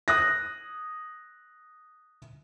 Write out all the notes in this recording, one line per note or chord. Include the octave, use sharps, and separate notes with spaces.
D#6 F#6 A#6